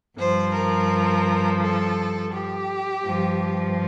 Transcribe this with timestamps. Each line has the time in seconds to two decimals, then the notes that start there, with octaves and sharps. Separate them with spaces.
0.18 G2 F3 C5
0.54 A#4
1.61 A4
2.33 G4
3.04 G2 F3